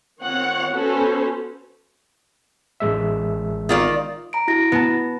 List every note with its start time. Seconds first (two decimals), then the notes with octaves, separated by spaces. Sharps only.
0.23 D#3 C4 F4 C#5 F#5
0.74 B3 C#4 F#4 A4 B4 C5
2.80 A1 G#3 E5
3.69 D#3 F4 D5
4.33 A#5 D7
4.48 E4 F#4 A#6
4.72 B3 A5